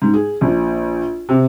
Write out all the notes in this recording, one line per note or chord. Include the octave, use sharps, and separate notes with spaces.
G#2
G#4
A#1
C3